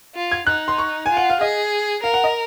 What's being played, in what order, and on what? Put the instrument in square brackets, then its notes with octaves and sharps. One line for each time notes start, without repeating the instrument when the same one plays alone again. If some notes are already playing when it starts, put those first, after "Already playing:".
[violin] F4
[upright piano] G#6
[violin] D#4 [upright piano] F#6
[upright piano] C6
C#6
[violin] F4 [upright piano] G#5
[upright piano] F#5
F5
[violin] G#4 [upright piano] D#5
[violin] A#4 [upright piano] F5
[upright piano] F#5
D#5